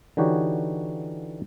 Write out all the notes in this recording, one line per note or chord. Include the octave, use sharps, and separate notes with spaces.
D3 E3 D#4 F#4 G4 C#5